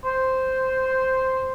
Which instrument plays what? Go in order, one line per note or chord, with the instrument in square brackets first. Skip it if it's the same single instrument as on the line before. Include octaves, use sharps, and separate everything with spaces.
[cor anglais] C5